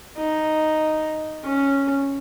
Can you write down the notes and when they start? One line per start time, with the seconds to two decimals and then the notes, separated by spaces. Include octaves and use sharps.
0.17 D#4
1.44 C#4